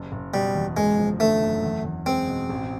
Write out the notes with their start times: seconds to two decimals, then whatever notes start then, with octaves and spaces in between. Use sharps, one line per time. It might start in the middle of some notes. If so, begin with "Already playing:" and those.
Already playing: F#1
0.12 F#1
0.34 B2 G3
0.55 E2
0.77 F#1 G#3
0.98 F3
1.20 D3 A3
1.41 F#2
1.63 E2
1.85 E2
2.06 G#3 C4
2.28 B2
2.50 A1